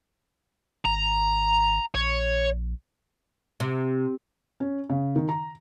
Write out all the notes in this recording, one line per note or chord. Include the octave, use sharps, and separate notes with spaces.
G#1 A#5
A#1 C#5
C3
C#4
C#3
D#3
A#5